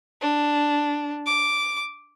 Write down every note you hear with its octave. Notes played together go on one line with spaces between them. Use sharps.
D4
D6